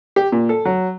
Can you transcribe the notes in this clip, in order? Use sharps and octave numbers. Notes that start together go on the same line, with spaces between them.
G4
A#2
A4
F#3